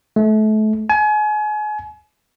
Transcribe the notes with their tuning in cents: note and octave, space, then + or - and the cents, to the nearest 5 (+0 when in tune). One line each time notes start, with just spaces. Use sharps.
A3 -30
G#5 +35